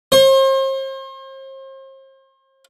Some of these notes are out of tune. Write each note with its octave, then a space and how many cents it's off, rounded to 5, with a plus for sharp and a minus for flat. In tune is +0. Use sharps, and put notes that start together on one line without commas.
C5 +40